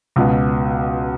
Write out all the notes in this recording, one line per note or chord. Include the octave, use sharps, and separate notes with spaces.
C#2 B2